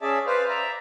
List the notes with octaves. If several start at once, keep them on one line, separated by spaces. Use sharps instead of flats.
C#4 G#4 D5 E5 A5
B4 C5 D5 F5
D5 E5 A#5